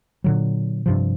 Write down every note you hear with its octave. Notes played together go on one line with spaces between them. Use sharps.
A#2 D3 F#3
G2 C3 F3